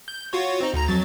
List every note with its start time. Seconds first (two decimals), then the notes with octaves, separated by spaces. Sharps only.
0.08 G6
0.33 F4 F#4 C#5
0.60 C4 D#4
0.74 D2 A#5
0.88 F2 F#3 A6